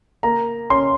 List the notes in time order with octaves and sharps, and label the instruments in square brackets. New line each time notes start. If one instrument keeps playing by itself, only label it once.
[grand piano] A#3 A#5
C#4 C6